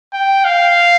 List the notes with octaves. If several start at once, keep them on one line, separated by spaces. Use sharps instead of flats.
G5
F5